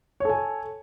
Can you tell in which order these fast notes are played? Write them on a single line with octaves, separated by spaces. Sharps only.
C#5 A4 G#5